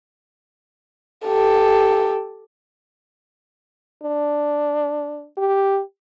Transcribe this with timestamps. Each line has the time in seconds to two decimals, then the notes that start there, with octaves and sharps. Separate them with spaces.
1.26 G4 A4
4.03 D4
5.38 G4